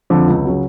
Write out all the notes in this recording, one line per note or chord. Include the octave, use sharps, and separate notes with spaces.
F2 D3 F3
C#2
C#3 F#3